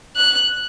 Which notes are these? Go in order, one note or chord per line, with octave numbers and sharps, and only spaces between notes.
F#6